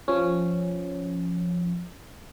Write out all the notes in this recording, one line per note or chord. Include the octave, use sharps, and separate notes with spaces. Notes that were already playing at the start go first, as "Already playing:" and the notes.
F3 C#4